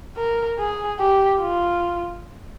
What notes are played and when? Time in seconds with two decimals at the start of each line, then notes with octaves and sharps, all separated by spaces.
0.17 A#4
0.59 G#4
1.00 G4
1.41 F4